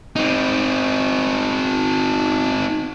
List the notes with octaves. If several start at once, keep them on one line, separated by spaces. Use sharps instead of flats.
C4 D#4